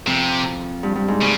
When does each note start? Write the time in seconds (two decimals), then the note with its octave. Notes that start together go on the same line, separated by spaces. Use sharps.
0.07 F2 C3
0.83 G2
0.95 G2
1.08 G#2
1.21 A2 C#3